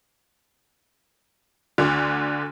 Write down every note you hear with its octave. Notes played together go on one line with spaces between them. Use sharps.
D2 D3